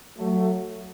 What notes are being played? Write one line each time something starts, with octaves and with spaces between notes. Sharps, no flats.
F#3 A3